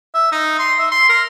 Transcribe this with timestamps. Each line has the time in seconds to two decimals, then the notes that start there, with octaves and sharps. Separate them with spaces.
0.15 E5
0.32 D#4
0.59 C6
0.79 E5
0.92 C6
1.09 A#4